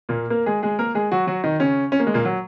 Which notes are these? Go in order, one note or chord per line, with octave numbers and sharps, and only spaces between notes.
A#2 A#3
A#3 A#4
G#3 G#4
G#3 G#4
A#3 A#4
G#3 G#4
F#3 F#4
F#3 F#4
D#3 D#4
C#3 C#4
C#4
A#3
G#3
A#2 A#3
F#3